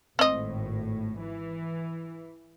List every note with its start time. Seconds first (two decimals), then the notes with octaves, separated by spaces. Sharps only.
0.19 G#1 A2 C4 D#5
1.19 E3